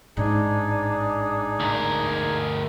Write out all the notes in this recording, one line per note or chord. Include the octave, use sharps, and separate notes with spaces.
A1 G#2 D4 D#4 G#4
D2 A#4